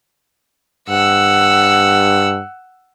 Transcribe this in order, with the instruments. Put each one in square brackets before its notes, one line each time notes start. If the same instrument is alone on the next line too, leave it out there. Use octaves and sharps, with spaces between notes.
[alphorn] G2 [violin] F#5 E6